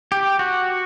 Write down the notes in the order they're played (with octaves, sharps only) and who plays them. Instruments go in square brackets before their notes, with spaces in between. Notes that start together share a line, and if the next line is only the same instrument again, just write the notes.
[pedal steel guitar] G4
F#4